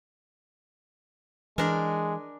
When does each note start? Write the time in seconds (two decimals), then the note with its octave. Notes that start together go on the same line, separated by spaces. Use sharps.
1.58 E3 G#3 D4 A#4